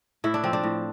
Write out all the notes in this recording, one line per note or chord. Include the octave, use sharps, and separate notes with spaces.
A2 E4
D4
F3 C4
D4
A2